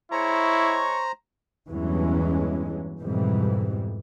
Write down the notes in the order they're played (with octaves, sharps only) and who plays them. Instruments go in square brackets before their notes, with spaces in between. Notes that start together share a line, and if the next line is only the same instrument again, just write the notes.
[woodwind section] G#3 C#5 C#6 [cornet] E4 [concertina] C5 A#5
[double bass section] E2 G2 E3 F#3 G#3 C#4
F2 G#2 B2 E3 G3